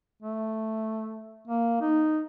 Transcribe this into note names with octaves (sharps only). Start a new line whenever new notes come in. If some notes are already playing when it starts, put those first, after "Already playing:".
A3
A#3
D#4